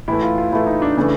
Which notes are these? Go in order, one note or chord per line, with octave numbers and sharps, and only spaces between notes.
A2 E3 A3 E4
F4
F4
A2 E3 A3 E4
D#4
D4
C#3 E3 A3